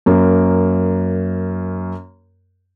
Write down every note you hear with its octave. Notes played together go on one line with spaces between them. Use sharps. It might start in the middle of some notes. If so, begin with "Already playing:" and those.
F#2 A#3